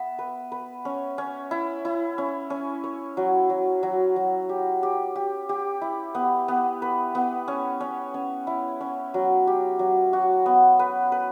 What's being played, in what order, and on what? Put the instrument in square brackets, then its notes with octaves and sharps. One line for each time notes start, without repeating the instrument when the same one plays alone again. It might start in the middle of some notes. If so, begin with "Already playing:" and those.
Already playing: [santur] B3 E5
B4
B4
C#4
C#4
E4
E4
C#4
C#4
C#5
F#3
F#3
F#3
F#3
G4
G4
G4
G4
E4
B3
B3
B4
B3
C#4
C#4
C#4
E4
C#4
F#3
G4
F#3
F#4
B3
B4
B4